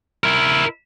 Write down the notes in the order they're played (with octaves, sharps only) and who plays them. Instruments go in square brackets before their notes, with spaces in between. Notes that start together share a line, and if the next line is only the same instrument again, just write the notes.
[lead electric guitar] E4 A#4